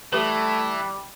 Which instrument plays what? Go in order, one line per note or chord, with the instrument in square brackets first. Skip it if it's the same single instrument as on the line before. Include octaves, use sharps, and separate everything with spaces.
[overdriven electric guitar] E3 [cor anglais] G3 [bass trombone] A3 [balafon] G4 B4